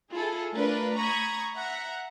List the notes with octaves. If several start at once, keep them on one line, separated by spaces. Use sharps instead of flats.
E4 F4 G#4 A4
A3 D4 F4 A#4 B4 D5
A#5 B5 C#6 D#6 G#6
E5 F#5 A#5